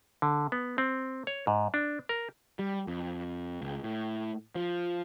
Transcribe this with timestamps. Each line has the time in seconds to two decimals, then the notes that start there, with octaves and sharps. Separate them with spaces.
0.22 D3
0.52 B3
0.78 C4
1.27 C#5
1.47 G#2
1.74 D4
2.09 A#4
2.59 G3
2.87 F2
3.62 C#2
3.84 A2
4.55 F3